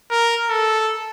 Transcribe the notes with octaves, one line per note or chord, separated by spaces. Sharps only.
A#4
A4